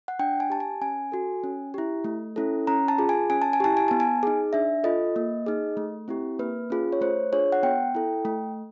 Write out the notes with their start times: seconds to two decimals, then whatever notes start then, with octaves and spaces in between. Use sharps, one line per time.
0.08 F#5
0.19 D4 G5
0.40 G#5
0.50 G4 A5
0.60 G#5
0.81 C#4 G#5
1.12 F#4 A4
1.44 C#4
1.74 E4 G4
2.04 A3
2.36 C#4 E4 A4
2.67 C#4 A#5
2.88 A5
2.98 F4 G#4
3.09 G#5
3.30 C#4 G#5
3.42 A5
3.53 G#5
3.60 E4 G4 A5
3.77 G#5
3.88 B3 A5
4.00 G#5
4.23 D#4 G#4
4.53 D4 E5
4.84 F4 A4 D#5
5.16 A#3
5.46 D#4 G#4
5.77 A3
6.08 C4 E4 G4
6.39 A#3 B4
6.70 C#4 F4 G#4
6.93 C#5
7.01 A3 C5
7.32 D4 F4 G#4 C#5
7.52 F#5
7.63 B3 G5
7.95 E4 A4
8.25 A3